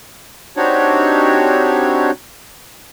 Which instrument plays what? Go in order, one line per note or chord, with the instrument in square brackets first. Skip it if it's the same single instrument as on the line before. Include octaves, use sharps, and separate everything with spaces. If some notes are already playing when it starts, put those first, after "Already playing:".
[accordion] C4 D4 D#4 F#4 G4 C#5